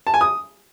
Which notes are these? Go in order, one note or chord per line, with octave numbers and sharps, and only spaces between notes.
A5
G#5
D#6